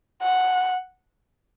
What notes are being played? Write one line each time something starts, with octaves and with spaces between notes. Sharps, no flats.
F#5